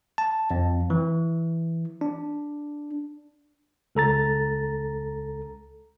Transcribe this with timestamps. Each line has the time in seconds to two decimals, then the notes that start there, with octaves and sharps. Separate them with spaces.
0.18 A5
0.51 F2
0.90 E3
2.01 D4
3.95 C#2 A4 A#5 A6